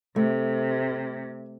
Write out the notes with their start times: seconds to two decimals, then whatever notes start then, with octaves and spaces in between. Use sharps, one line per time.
0.16 C3 A3